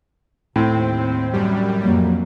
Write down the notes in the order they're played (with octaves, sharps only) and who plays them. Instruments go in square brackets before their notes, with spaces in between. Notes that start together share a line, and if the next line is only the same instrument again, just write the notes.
[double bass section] D#2 [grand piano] A2 [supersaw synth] C4
[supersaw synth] F#2 G3
[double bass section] F2 F#3 A#3